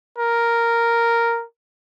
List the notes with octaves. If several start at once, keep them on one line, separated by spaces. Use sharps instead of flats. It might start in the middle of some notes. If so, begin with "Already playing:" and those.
A#4